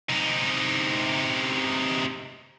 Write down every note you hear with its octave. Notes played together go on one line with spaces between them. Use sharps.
C3 D#4